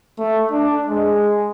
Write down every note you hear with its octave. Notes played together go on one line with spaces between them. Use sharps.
A3
D4
G#3